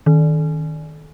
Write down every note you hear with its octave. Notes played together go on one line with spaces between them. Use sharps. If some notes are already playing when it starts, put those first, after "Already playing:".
D#3